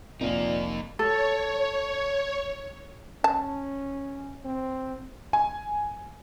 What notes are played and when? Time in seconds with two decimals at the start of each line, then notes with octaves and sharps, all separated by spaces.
0.21 F1 A#2 A#3 C4 D#4
0.99 A4 C#5
3.24 C#4 A5
4.45 C4
5.33 G#5